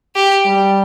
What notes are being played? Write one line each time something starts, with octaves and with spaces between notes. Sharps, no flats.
G4
G3